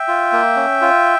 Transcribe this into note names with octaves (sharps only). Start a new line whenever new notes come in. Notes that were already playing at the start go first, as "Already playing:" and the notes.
Already playing: E5 G5
F4
A#3
C#4
F4